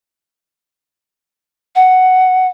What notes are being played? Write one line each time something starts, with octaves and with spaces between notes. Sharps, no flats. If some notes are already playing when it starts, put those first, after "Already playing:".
F#5